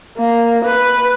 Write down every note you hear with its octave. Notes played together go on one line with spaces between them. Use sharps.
A#3
B4